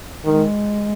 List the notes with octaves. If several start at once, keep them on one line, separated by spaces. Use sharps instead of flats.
D#3 G#3